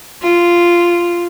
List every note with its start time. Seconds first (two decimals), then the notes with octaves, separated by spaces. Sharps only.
0.22 F4